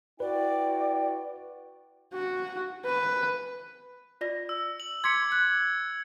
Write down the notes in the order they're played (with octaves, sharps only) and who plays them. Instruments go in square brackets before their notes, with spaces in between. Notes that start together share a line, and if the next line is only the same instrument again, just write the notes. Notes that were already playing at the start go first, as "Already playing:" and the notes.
[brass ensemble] E4 F#4 G5 [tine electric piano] B4 [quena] D5
[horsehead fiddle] F#4
B4
[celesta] F4 D5 A#6
[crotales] E6
F#7
[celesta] C6 D6 B6 [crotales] G#6 C#7
[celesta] F#6